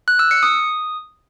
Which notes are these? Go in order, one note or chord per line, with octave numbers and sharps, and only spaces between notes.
F#6
E6
C#7
D#6